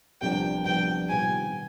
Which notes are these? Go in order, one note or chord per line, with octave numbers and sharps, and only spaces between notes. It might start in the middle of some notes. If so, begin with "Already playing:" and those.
C2 C3 F3 B3 D4 G5
C2 C3 F3 B3 D4 G5
C3 D#3 G3 B3 F4 G#5
C3